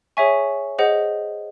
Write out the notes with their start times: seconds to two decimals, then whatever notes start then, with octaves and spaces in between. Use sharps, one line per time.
0.17 G#4 C#5 E5 G#5 C#6
0.79 G#4 C5 D#5 F#5